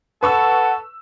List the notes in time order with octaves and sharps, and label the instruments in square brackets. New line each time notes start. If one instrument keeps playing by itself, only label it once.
[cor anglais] A4 [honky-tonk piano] B4 C#6 E6 [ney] F#5